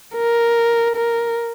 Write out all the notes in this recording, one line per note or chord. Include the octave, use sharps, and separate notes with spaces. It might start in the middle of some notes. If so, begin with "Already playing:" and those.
A#4
A#4